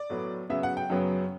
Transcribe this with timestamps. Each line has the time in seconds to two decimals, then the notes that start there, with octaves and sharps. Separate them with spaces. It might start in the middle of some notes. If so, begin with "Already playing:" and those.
Already playing: D5
0.10 A2 F#3 B3
0.50 C#3 F#3 B3 E5
0.63 F#5
0.77 G5
0.90 F#2 C#3 F#3 B3